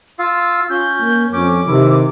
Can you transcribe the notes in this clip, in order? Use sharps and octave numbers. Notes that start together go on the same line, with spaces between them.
F4 F5 E6
C#4 F4 G6
A#3
F2 C#4 D6
C3 D#3 E4